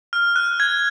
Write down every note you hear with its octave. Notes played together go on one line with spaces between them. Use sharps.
F6
F#6
G#6